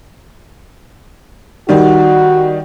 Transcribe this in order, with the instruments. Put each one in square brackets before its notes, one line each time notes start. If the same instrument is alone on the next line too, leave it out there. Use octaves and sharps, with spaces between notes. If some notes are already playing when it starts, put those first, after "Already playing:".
[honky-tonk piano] D#3 G3 D#4 [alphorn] F#4